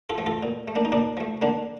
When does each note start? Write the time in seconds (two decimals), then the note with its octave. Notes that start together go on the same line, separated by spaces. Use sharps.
0.09 F4 A4
0.18 F3 A3
0.26 F4 A4
0.43 A#2
0.68 A3
0.75 A#3 D4
0.85 D#4
0.92 A#2 A#3 D4
1.17 F3 A3
1.42 D3 A#3 D4